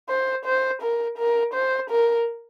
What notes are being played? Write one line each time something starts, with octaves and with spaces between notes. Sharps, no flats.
C5
C5
A#4
A#4
C5
A#4